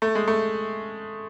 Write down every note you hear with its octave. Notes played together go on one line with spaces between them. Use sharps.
A3
G#3
A3